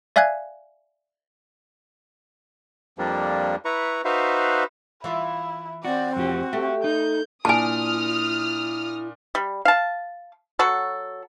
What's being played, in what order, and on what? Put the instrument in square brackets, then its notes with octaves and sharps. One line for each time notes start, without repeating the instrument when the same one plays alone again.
[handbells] D5 E5 F5 G#5 F#6 G#6
[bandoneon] F2 F3 G3 A#3 D4
E4 B4 A#5 C#6
D#4 F#4 B4 C5 E5 F5
[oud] E3 F4 [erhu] E4
[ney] C4 [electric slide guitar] F#4 [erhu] D5
[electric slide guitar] F2 F3 G4 [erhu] F#4
[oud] A3 [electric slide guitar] G4
[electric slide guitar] D#4 [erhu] G6
[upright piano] A#2 D4 [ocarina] E4 [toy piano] G#5 A5 [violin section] D#6 F6
[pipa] G3
F5 A5
F#3 F#4 A4